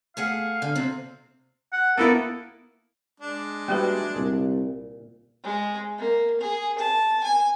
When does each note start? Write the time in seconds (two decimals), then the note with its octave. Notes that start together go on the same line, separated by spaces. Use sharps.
0.17 A3 G#4 F5 F#5
0.62 D3
0.75 C3 C4
1.73 F#5
1.98 A#3 B3 E4 A4
3.20 G#3 D4
3.68 G3 A#3 E4 F#4 B4 A5
4.16 C2 A#2
5.43 G#3
5.98 A#3
6.40 G#4
6.79 A5
7.24 G#5